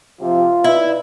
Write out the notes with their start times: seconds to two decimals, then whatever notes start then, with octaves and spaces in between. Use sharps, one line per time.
0.21 C3 F3 F4
0.64 D#4 E4 B4 D5